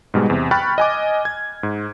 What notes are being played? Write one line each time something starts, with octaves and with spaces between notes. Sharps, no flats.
G#2 B2 G3 G#3
E2 C3
G5 B5 C#6 F6 F#6 A6
D#5 G#5 D6
G#6
G#2